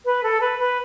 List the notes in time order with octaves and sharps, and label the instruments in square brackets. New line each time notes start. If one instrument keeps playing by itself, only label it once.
[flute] B4
A4
B4
B4